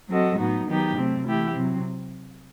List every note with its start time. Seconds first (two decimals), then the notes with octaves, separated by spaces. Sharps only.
0.09 F#3 C4 F#4 A4 D#5
0.38 A2 F#3 B3 D#4 F#4
0.67 D#3 F#3 B3 D#4 G4
0.96 C3 F#3 A3 C4
1.25 E3 A3 E4 G4
1.54 C3 F#3 C4